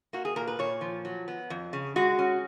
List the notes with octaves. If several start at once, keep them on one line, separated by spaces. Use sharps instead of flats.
A#3 F#4
G#4
A#2 A#4
B4
A#2 C#5
F3
F#3
B3
F2
C#3
G#3 F#4
C#4